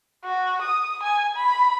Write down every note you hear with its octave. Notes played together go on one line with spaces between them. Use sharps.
F#4
D#6
G#5
B5